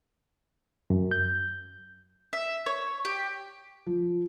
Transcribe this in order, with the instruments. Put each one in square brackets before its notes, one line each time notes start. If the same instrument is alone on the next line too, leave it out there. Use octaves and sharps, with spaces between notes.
[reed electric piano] F#2
G6
[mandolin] E5
C#5
G4
[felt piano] F3